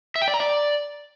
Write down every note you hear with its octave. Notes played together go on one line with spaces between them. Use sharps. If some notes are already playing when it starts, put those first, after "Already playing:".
E5
G5
D5
A#5
D5